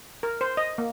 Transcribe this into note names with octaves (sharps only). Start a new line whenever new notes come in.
A#4
C5
D#5
A#3